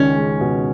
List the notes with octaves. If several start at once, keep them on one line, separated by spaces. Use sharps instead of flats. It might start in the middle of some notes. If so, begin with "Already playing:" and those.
Already playing: C#2 D#3 C#4
G#3
B2